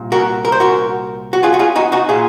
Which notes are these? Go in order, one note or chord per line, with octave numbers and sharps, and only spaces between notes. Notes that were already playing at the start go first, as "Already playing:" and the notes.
Already playing: C2 A#2
F#4 A#4
A#4
C5
F#4 A#4
F#4
F4 G#4
F#4
F4 G#4
D#4 F#4
D#4 F#4
A#2 F4 G#4